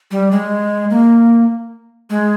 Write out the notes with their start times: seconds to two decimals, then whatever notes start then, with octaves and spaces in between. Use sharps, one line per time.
0.11 G3
0.31 G#3
0.90 A#3
2.10 G#3